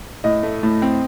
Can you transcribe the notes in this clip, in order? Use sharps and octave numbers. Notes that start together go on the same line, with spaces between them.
A2 D#5
A3
A2
C4